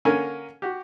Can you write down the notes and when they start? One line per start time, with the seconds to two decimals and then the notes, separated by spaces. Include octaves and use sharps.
0.05 D3 A#3 C#4 A#4 G#5
0.62 F#4 G4